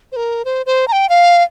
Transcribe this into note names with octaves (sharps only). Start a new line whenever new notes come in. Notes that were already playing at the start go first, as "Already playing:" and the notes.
C5
A#4
C5
C5
A#5
G5
F5